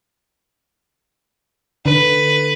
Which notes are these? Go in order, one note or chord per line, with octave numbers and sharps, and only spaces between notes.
D3 B4